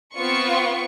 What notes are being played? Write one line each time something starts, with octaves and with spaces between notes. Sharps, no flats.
B3 C4 F4 C#6 C#7